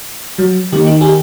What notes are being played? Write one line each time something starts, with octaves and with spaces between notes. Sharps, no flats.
F#3
D#3 A#3 G4
D#4
G4 G#4